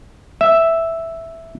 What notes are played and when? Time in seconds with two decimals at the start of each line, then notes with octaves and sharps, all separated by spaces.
0.41 E5